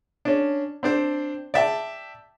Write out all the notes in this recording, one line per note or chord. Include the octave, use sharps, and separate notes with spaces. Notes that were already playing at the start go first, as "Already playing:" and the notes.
C#4 D4
C4 D4 C5
D5 E5 G5 A5